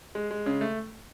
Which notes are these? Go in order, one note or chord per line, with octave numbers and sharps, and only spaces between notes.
G#3
G#3
C#3
A3